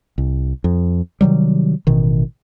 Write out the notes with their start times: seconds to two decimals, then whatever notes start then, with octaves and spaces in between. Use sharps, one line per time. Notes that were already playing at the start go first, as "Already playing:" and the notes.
0.18 C2
0.64 F2
1.21 C3 D#3 F#3 G3
1.87 A1 B2 D#3